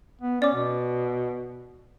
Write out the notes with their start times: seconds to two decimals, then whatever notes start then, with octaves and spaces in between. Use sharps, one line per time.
0.22 B3
0.42 C#4 D5 D6
0.54 B2